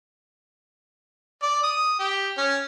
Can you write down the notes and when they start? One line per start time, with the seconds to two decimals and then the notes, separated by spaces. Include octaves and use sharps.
1.42 D5
1.63 D#6
1.99 G4
2.38 C#4